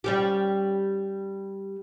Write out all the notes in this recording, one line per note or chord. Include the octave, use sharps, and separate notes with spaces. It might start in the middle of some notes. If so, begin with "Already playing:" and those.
G3 C#4 G4